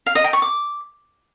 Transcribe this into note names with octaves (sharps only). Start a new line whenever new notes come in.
F5
D#5
G5
C#6
D6